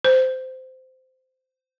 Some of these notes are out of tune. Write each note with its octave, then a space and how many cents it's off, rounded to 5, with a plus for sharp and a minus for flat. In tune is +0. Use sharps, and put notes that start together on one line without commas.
C5 -15